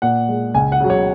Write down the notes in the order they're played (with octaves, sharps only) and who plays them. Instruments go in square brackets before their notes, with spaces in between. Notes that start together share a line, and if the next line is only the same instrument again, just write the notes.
[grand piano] A#2 F#5
G#3
C#2 G#5
F#5
C#3 F#3
C#5